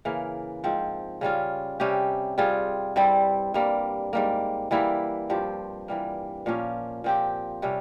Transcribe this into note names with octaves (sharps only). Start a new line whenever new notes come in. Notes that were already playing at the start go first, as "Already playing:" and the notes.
C#3 E3 A#3
G#2 F3 C4
C#3 G3 C#4 F4
C3 G3 C#4 G4
G3 C4 F4 G#4
G2 G3 C4 E4
G2 G3 A#3
G#2 G3 A#3
E3 G3 A#3 E4
G2 F3 C4 G4
E3 G3 A#3
A#2 F3 A#3 C#4
A#2 F3 C4 G4
C3 G3 C#4